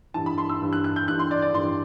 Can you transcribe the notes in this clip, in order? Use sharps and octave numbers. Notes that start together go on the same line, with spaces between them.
G2 E3 A5
B5
C6
E6
G2 E3
F#6
F#6
G6
G2 E3 F#6
C6
D5
D5
G2 E3 C6